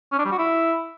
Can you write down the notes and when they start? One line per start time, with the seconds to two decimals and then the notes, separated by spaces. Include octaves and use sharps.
0.12 C#4
0.18 D4
0.25 G3
0.32 F#4
0.38 E4